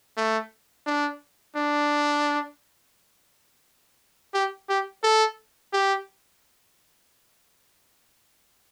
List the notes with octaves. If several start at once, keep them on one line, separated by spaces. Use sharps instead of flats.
A3
D4
D4
G4
G4
A4
G4